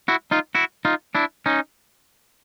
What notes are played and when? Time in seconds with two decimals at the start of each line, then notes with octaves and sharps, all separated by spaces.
0.08 E4 F#4
0.31 D#4 F4
0.55 E4 F#4
0.85 D#4 F4
1.15 D4 E4
1.46 C#4 D#4